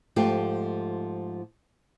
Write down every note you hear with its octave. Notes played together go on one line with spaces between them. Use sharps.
G#2 F3 A3 F4 G4